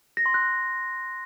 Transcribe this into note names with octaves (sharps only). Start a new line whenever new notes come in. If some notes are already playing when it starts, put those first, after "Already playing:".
A#6
C6
F#6